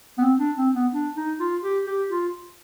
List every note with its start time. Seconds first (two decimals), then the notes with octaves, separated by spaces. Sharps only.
0.18 B3
0.22 C4
0.39 D4
0.57 C4
0.75 B3
0.93 D4
1.16 D#4
1.40 F4
1.64 G4
1.87 G4
2.10 F4